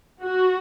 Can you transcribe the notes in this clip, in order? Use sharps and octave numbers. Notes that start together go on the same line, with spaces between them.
F#4